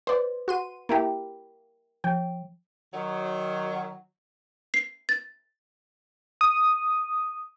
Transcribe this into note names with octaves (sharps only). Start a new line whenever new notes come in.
B4 C5 D5
F#4 C6 D#7
A#3 E4 G4 A#4 G5
F3 G5
D#3 F#3
C7
A6
D#6